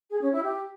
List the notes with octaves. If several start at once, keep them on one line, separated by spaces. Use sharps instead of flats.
G#4
C#4
E4
G4